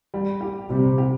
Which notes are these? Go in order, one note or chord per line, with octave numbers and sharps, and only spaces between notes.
G3
G4
C3 G3
G4